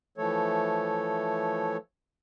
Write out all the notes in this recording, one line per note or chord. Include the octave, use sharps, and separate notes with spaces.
E3 F3 A3 A4 C#5